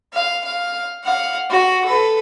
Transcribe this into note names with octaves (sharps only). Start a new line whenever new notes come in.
F5
F5
F5 F#5
F#4
A4 B4